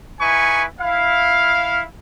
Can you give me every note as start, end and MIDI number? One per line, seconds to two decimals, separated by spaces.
0.21 0.63 63
0.21 0.63 64
0.21 0.63 71
0.21 0.63 80
0.21 0.63 85
0.80 1.82 64
0.80 1.82 77